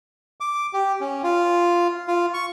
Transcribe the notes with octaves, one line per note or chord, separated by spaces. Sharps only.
D6
G4
C#4
F4
F4
C#6